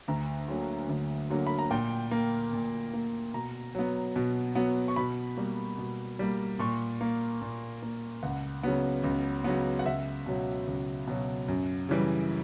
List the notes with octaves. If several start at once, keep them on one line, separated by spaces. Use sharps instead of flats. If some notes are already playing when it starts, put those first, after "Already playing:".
D2 A#5
D3 F#3 A#3
D2
D3 F#3 A#3
B5
A#5
A#2 G5
A#3
A#2
A#3
B2 A#5
F#3 B3
B2
F#3 B3
C#6
B2 B5
G3 A#3
B2
G3 A#3
A#2 C#6
A#3
A#2
A#3
C#2 F#5
C#3 F#3 B3
C#2
C#3 F#3 B3
F#5
C#2 E5
B2 F#3
C#2
B2 F#3
F#2
C#3 E3 G3